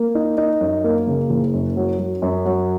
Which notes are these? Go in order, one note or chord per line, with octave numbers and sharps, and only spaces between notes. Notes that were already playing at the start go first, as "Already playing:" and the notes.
Already playing: A#3
D#4
D#4
F#2
A#3
C#3
F#1
F#2
F#3
F#3
F#2
F#3